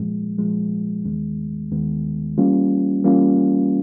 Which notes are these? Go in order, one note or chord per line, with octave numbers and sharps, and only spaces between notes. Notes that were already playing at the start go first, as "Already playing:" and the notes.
Already playing: A#2 F3 G#3
A#2 F3 G#3
D#2 D#3 G#3 B3
D#2 D#3 G#3 B3
E3 G3 A#3 C#4 F4
E3 G3 A#3 C#4 F4